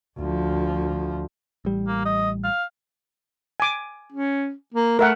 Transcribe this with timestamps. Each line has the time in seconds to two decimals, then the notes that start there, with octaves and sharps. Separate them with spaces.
0.18 D2 F3
1.65 A1 G3
1.88 A#3
2.05 D#5
2.44 F5
3.60 G#5 D6
4.12 C#4
4.74 A#3
4.99 A3 A#4 E5 F#5